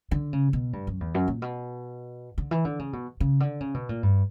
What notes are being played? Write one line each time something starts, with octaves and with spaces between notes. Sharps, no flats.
D3
C#3
B2
G2
F#2
E2
F#2
A#2
B2
D3
E3
D3
C#3
B2
C#3
D3
C#3
B2
A#2
G2